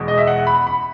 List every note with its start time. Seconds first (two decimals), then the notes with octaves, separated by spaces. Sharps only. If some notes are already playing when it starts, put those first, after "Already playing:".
Already playing: E2 B2 G#3
0.08 D#5
0.18 E5
0.27 F#5
0.47 B5
0.67 B5